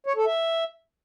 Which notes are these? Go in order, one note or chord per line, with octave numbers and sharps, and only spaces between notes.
C#5
A4
E5